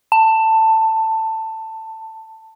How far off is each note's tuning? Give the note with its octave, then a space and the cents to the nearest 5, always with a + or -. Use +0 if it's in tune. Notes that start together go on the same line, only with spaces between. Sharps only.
A5 +15